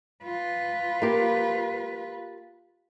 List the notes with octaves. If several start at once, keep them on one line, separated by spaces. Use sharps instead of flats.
F4 B4
A#3 G4